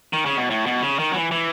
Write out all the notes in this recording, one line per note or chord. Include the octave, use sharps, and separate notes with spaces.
D#3
C#3
B2
A2
B2
C#3
D#3
F#3
E3
E3